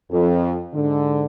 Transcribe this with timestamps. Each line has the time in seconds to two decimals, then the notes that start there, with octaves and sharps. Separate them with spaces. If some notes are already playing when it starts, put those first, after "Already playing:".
0.11 F2
0.74 G#2 D3